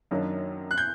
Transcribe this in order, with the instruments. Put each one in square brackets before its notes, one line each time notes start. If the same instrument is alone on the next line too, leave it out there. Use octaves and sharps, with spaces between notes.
[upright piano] F#2 D#3 F#3 A#3 D4
[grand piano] F#6
G6